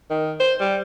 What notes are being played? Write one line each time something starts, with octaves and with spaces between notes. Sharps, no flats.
D#3
C5
G3